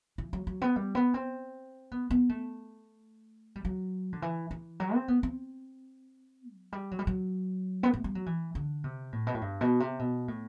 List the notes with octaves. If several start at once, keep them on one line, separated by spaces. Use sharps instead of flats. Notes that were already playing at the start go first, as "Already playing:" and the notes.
E3
F#3
F#3
B3
G3
B3
C4
B3
B3
A3
G3
F#3
D3
E3
E3
F#3
C4
B3
C4
F#3
G3
F#3
G3
F#3
B3
A3
G3
F#3
E3
D3
C3
A2
B2
A2
G2
B2
C3
B2
A2